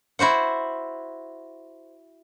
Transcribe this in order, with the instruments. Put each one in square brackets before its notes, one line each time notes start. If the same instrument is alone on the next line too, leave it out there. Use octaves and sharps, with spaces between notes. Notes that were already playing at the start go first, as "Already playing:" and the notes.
[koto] E4 F#4 C5 F#5